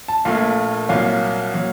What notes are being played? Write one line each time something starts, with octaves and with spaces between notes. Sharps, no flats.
A5
A#1 A#2 A3 F5
C2 A#2 F#3 F5
A#2 F#3